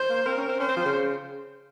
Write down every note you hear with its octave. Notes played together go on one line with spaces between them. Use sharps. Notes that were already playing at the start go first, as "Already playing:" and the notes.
Already playing: C5
A#3
C4 A#4
C#4
C4
C#4 C5
C4
F3
C#3